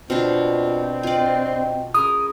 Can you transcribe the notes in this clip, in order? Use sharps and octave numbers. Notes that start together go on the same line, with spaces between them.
B2 C4 D4 F4
F4 D5 D#5 G5
C#4 G#4 A#4 B5 D#6